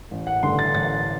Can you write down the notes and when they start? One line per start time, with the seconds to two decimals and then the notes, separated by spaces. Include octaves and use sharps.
0.11 A1
0.27 F#5
0.43 G2 D3 A3 C6
0.59 A6
0.75 A1 A6